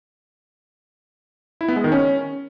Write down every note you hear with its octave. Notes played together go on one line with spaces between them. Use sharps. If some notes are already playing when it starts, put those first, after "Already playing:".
E4
B3
G#3
D#3
C#4